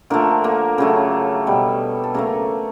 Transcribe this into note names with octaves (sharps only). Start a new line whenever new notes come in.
D3 F3 A3 A#3 A#4
A#3 A#4
C#3 F#3 A3
B2 G3
A4
C#3 F#3 A3 A#3 A#4